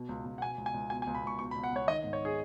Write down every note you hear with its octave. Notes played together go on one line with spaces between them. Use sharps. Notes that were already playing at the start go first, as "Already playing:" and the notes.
Already playing: B2
C#2
C#2
F#5
B2 G#5
C#2
G#5
C#2
B2 G#5
G#5
C#2
B5
C#2 C#6
B2 C#6
B5
C#2
F#5
C#2 C#5
D#3 D#5
G#2
C#5
G#4